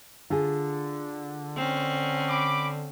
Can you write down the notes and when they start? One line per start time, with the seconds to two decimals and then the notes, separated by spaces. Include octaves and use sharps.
0.30 D3 F4 G#4
1.56 C4 C#4
2.28 B5 D6